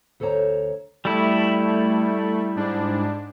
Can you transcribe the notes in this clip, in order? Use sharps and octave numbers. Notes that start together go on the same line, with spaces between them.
D2 A4 C5 C#5 A#5
G3 A3 E4
G#2 D4